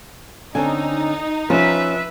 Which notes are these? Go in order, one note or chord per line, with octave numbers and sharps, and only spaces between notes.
D3 C4 C#4 D#4 G#5
F3 C#4 B4 E5